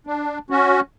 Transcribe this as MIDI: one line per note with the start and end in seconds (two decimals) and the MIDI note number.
0.07 0.38 62
0.50 0.81 61
0.50 0.81 66